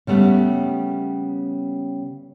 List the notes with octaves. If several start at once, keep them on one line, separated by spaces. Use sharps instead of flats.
C#3 G3 A3 B3